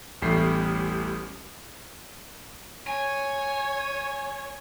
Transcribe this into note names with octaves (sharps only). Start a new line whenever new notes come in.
A1 E2 G3 A3 C7
C#5 G#5